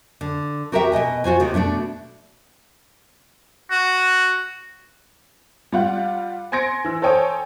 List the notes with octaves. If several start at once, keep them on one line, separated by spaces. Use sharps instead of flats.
D3
F#4 G4 A#4 C5 E5 G5
B2 E3 D#5 G#5
F4 F#4 C5 G#5
D#2 C3 D#3
B2 A3 D4 D5
F#4
G3 F4 F#5
G#5 C6 G#6 A#6 C#7 D7
E3 E6
A4 C5 C#5 G5 G#5 D#6